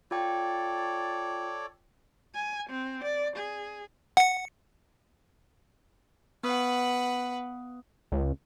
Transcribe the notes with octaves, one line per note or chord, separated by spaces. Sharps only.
F4 A4 C#5 D5 G5
G#5
C4
D5
G#4
F#5 C#7
B3 B4 F#5 D#6 F#6
C#2